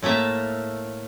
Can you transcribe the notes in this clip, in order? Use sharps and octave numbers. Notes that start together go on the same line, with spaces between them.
A2 A3 A#3 E5